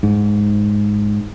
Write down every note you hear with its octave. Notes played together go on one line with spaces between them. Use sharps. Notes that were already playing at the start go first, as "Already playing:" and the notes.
G#2